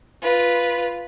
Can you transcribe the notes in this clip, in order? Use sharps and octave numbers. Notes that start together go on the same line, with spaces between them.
F4 B4